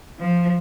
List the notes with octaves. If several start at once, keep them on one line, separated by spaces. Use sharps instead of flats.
F3